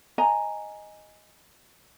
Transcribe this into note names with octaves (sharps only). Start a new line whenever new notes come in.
D#5 G#5 A#5